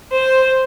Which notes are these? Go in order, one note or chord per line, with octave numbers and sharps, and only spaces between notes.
C5